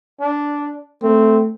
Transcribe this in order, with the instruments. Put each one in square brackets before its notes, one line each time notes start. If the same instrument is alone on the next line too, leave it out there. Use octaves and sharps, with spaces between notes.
[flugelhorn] D4
[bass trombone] A3 [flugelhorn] C4